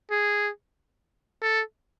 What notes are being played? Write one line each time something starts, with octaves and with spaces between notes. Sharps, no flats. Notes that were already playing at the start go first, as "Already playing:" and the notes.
G#4
A4